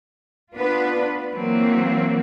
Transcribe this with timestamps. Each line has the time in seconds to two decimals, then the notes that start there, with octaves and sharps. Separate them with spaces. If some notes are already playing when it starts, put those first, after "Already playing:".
0.56 B3 D4 F4 B4
1.32 E3 F#3 A#3 C4